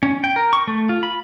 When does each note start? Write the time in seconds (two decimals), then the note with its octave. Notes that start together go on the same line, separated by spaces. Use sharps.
0.03 C#4
0.24 G5
0.36 A#4
0.53 C#6
0.68 A3
0.89 F4
1.03 B5